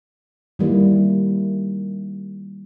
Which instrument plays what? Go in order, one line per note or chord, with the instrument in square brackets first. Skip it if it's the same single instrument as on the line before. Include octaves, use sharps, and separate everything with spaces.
[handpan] D#3 G3 A#3 E4